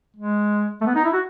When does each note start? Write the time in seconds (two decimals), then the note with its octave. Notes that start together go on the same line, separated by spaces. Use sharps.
0.16 G#3
0.81 A3
0.86 B3
0.95 D#4
1.04 E4
1.13 F#4